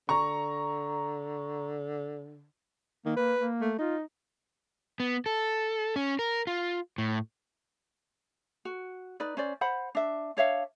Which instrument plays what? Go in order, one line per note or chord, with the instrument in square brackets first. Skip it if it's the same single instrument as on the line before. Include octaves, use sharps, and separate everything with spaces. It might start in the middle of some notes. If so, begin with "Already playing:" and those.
[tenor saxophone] D3 [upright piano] A#5 C#6
[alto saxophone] D#3 [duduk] A#3
[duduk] A#3 [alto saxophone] B4
[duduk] A#3
[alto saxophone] A3
[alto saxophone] D#4 [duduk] F4
[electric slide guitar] B3
A4
C#4
A#4
F4
A2
[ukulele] F#4
D#4 B4 D5
C#4 C5 D5
C5 F#5 B5
D4 E5
D4 C#5 E5 F5